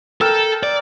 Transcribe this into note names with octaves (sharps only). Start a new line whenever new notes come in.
A4 A#4 G5 E6
D5